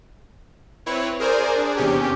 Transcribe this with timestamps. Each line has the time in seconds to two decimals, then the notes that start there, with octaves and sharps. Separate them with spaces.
0.86 C4 E4 B4 C#5
1.20 G#4 A#4 C5 D5 G#5
1.56 D4 G#4
1.77 E2 C3 C#4 G4